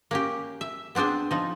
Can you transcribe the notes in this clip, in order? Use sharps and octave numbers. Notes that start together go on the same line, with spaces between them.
A#3 C#4 G4
E5
B3 C4 D4 G#4 C5
F3 D#4